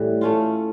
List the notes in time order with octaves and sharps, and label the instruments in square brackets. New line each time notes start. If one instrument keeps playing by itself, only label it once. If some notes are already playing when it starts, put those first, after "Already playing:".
Already playing: [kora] A2 E3 G3
A3 C#4 F4